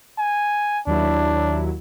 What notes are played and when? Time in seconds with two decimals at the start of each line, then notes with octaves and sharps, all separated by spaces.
0.18 G#5
0.87 D#2 F#3 D4 E4